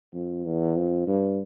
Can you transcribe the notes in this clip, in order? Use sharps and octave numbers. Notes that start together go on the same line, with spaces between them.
F2
E2
F2
G2